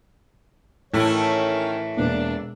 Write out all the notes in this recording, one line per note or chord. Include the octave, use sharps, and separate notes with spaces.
A2 D#3 E3 A3 C#4 E4 C#5
E1 A#3 D4